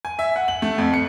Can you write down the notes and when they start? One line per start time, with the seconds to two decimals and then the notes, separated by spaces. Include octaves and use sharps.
0.05 G#5
0.19 E5
0.36 F#5
0.48 F#7
0.62 A3
0.78 F2
0.94 C#7